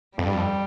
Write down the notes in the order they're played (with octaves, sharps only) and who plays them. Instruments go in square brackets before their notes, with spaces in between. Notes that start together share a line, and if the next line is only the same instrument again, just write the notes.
[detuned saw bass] F2 [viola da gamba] G3
[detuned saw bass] G2
F2